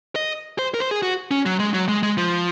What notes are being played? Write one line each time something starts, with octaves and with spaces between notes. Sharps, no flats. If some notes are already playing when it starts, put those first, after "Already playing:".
D#5
C5
A#4
C5
G#4
F#4
C#4
F#3
G#3
F#3
G#3
G#3
F3